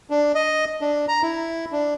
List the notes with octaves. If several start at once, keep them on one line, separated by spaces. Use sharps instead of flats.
D4
D#5
D4
A#5
E4
D4